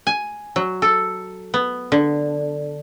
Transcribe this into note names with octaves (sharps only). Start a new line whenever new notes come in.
G#5
F#3
A4
B3
D3